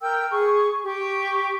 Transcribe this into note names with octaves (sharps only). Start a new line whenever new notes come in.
A#4 G5 E6
G#4 C#6
G4 C#6